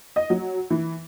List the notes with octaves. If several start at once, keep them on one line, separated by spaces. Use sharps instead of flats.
D#5
F#3
E3